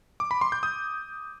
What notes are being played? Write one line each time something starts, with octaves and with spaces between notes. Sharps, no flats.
D6
B5
C6
G6
D#6